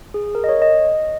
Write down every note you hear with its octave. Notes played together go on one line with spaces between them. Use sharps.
G#4
A#4
D#5
C#5
D#5